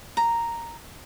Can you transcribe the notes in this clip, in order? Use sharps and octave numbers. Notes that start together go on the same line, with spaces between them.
A#5